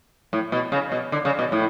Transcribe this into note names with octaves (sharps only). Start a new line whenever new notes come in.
A2
B2
C#3
B2
D3
C#3
B2
A2